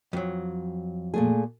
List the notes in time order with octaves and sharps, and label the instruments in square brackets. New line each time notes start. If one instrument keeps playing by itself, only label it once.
[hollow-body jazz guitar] F2 F#3
[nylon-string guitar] A#2 A3 G#4